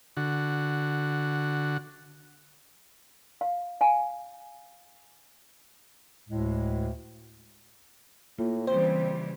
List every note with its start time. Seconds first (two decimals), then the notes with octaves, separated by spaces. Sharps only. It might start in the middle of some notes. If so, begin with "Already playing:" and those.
0.17 D3 F#4
3.41 F5
3.81 F5 G#5
6.29 D2 A2 G#3
8.39 A2 A#3 F4
8.67 C#3 E3 G3 C4 C5